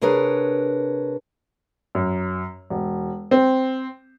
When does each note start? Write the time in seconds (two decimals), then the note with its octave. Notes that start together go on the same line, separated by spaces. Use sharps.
0.01 C3 D4 G#4 A#4 B4 C#5
1.95 F#2
2.70 E1
3.31 C4